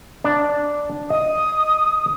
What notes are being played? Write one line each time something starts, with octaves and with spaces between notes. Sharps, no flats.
D4
D#5 D#6